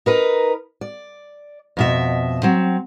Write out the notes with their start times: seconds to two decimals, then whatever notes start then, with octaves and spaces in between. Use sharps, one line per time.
0.06 D#4 A#4 B4
0.81 D5
1.77 F2 B2 E5
2.43 F#3 C4